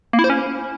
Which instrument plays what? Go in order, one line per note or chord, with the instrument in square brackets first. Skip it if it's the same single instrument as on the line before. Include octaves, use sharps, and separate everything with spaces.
[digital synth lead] A#3
E4
C5
C#4